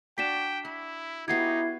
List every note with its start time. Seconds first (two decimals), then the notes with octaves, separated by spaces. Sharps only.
0.18 D4 F#4 D5 G5 B6 E7
0.65 E4 B5
1.28 B3 D#4 E4 F#4 G4 G#6 C7